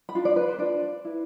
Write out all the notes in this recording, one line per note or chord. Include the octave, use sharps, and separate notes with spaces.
B5
D4 F4
D5
B4
C5
D4 F4 B4 D5
E4 B4